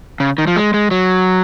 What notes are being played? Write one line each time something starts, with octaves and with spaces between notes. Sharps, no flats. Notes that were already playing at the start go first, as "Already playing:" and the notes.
C#3
D#3
F3
G#3
G#3
F#3